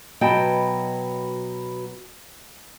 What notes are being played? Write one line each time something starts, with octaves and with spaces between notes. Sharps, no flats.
B2 F#3 B3 D#5 G5 A5